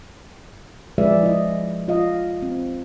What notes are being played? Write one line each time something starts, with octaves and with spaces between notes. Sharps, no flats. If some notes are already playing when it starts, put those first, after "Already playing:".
F3 G#3 G#4 B4 D5 E5
E4 D#5
F4 D#5 F5
C4